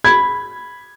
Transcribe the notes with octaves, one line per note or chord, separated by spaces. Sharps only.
B5 G#6